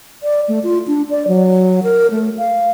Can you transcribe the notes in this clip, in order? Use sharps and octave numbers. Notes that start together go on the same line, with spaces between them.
D5
A3
F4
D4
D5
F#3
A#4
A3
F5